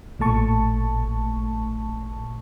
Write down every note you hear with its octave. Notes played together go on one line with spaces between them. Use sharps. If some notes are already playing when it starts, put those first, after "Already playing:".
A1 A#2 A3 A5 C#6